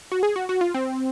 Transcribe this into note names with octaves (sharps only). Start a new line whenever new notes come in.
F#4
G#4
F#4
F#4
F4
C4